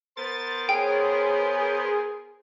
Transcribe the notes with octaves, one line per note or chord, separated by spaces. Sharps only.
B3 A#4 C5 A6
G#4 C#5 G5